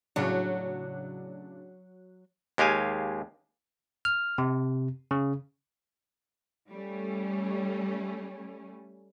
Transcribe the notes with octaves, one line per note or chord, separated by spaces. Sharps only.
A2 C#3 F#3 D4
D#2 G#3 G4 F5 G#5
F6
C3
C#3
G3 A3 C#4